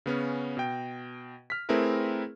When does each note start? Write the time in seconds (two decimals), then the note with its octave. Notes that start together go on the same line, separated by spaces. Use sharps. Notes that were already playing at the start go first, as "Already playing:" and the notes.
0.06 C#3 B3 C#4
0.57 B2 G5
1.50 F6 B6
1.69 A3 C4 E4 G#4 A#4 B4